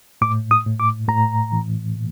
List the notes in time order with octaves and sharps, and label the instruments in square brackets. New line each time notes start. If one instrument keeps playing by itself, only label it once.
[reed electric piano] A2 D6
D#6
A2
D6
A2 A#5
E3
A#2